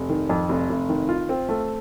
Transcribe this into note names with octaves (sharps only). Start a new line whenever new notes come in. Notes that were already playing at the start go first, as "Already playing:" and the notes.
Already playing: F1
D#3
F2
F1
F1
D#3
F4
C4
A3